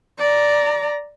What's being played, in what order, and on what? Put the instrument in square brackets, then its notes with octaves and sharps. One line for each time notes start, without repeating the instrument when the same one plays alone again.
[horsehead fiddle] D5 A#5